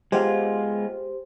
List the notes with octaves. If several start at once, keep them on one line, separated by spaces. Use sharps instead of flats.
G#3 B3 F4 G4 C5